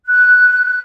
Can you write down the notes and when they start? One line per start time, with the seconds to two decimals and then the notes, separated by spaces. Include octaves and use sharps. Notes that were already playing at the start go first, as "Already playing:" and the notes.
0.07 F#6